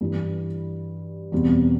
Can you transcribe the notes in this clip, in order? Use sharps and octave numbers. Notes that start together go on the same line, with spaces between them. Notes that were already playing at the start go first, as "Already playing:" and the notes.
G2 E3 G3
E2 B2 G3 C4